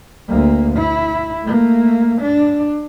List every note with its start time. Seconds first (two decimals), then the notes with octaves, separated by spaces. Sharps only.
0.29 D2 A#3
0.76 E4
1.45 A3 A#3
2.20 D4